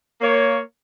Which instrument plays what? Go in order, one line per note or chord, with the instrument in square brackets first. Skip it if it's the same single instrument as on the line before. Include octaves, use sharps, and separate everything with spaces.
[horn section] A#3 C#5